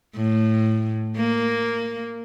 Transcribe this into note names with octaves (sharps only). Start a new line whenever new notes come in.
A2
A#3